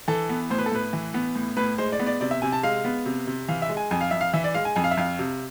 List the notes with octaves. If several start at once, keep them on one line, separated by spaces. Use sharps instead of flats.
E3 A4
B3
A2 C5
B4
A4
A2 B4
E3
B3
A2
A2 B4
G#3 C5
D5
B3
D5
C3 D5
E5
C3 G#5
A5
G#3 F5
B3
C3
C3
E3 F5
E5
G#3
G#5
F2 G#5
F5
F2 E5
F5
E3 E5
D5
G#3 F5
G#5
F2 G#5
F5
E5
F2 F5
C3